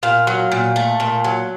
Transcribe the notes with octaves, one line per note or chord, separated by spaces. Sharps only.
A#2 F5
F#3
A#2
A3
A#2
F#3